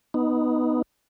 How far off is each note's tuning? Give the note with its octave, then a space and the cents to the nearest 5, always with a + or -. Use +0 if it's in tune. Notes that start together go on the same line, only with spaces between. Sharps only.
B3 +0 D#4 +0